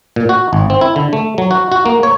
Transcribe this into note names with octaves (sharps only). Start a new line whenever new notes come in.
A#2
F#4
G#1
C4
E4
D3
A3
F#3
F#4
F#4
A#3
C#5